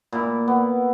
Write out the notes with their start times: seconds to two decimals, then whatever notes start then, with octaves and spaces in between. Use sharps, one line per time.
0.12 A#2 E4
0.48 B3